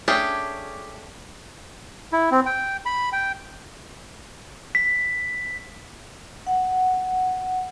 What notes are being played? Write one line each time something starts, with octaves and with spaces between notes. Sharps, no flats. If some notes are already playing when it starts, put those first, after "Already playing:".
A3 C#4 D4 G4 G#4
E4
C4
G5
B5
G5
B6
F#5